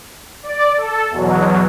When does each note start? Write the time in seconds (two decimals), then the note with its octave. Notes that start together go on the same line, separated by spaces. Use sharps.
0.43 D5
0.78 A4
1.10 E2 B2 F#3